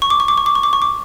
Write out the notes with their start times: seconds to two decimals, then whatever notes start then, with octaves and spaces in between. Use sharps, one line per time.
0.02 C#6
0.10 D6
0.20 C#6
0.28 D6
0.38 C#6
0.46 D6
0.55 C#6
0.63 D6
0.73 C#6
0.82 D6